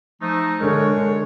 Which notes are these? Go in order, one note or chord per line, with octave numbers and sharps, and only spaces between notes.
F3 A3 D#4
D3 G#3 A#4 C#5